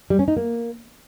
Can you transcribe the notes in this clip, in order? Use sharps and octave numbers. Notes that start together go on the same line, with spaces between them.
G3
C#4
D#4
A#3